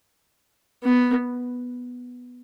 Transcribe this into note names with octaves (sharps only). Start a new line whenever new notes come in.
B3